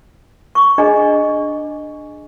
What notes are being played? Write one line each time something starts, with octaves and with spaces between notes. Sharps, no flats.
C#6
D4 G#4 D#5 A#5